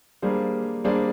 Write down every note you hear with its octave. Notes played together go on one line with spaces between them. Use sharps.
G3 A#3 D4 G#4 C5
G3 A#3 D4 G#4 C5